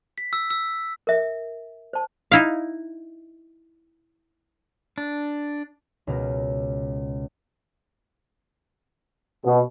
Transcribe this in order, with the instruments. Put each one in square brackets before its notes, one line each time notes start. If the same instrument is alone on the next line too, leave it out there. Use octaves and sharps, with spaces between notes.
[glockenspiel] B6
E6
E6
[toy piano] A#4 E5
C5 A5
[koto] D#4 E4 F5
[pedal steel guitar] D4
[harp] C#2 B2 A#4
[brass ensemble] B2